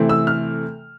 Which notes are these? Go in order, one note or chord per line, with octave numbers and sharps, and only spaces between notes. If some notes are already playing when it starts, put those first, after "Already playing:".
Already playing: C3 E3 A3 C4
E6
F6